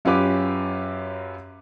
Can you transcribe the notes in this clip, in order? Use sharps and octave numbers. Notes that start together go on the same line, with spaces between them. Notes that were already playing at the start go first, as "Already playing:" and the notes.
F#2 C#4 F4 G4 B4 D6